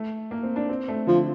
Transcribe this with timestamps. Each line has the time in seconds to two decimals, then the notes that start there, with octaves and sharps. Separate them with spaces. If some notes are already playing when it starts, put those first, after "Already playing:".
Already playing: A3
0.31 A#3
0.43 C4
0.56 D4
0.69 C4
0.88 A3
1.07 D3 F3